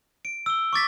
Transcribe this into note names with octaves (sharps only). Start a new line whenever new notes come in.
D7
E6 G7
C#6 D6 A6 B6